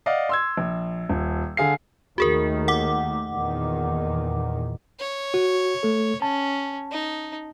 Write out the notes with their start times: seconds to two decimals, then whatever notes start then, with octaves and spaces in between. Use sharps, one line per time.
0.06 D5 D#5 F5 F#5
0.29 C6 E6 G#6
0.57 A#1
1.09 D#1
1.57 D3 G#4 F5 C7
2.18 D#2 D#3 A3 F#4 G#4 A#4
2.68 F#5 D6
3.31 E2 A#2 D#3
5.00 C#5
5.34 F#4
5.83 A3 A4
6.22 C#4 A5
6.92 D#4